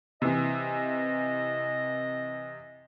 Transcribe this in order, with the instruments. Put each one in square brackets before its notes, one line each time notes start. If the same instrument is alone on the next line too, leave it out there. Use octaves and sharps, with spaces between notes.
[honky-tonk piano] C3 E3 [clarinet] D#5